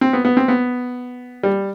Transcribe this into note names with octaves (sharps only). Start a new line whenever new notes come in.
C4
B3
B3
C4
B3
G3